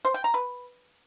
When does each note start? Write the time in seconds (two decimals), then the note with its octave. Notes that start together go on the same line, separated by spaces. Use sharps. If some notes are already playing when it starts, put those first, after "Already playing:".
0.05 C5
0.14 G5
0.24 A#5
0.34 B4